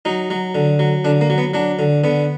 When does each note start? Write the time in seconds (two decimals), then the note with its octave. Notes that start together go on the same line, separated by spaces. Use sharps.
0.05 F#3 D#4
0.30 F#3
0.55 D3
0.79 F#3
1.05 D3 D4
1.21 A#3
1.30 F#3
1.38 B3
1.54 F#3 D4
1.79 D3
2.04 D3 B3